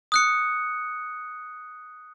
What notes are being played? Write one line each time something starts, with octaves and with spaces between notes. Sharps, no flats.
D#6 F#6 C#7